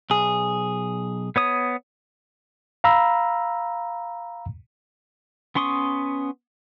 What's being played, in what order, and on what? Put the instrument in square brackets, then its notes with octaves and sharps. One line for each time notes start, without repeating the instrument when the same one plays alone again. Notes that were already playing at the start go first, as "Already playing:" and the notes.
[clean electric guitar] B1 G#4
[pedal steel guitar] B3 C#5 D#6
[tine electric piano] F5 A#5 B5 E6
[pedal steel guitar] B3 C#4 C6 C#6 D#6